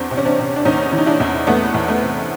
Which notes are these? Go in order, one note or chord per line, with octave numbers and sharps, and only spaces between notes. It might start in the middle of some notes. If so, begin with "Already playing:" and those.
Already playing: E2 C4 D4
C3
C#4
C4 D4
C3
D4
E2 C#4 D#4
E3
D#4
D4 E4
E2
E2 A3 B3
E2
A3 B3
C3